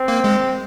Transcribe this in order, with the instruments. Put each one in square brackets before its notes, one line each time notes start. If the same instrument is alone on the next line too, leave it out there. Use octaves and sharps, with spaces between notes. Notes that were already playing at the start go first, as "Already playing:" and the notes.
Already playing: [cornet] C4
[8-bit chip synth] A#3
G#3